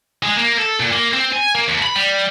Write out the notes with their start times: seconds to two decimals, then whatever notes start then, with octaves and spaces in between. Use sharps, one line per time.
0.23 G#3
0.37 A#3
0.58 A4
0.80 A#2
0.92 A#3
1.13 C4
1.32 G#5
1.55 A#3
1.68 D#2
1.82 B5
1.95 G3